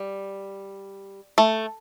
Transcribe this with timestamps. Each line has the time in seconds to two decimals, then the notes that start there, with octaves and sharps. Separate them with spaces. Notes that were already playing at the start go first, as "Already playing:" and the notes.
Already playing: G3
1.38 A3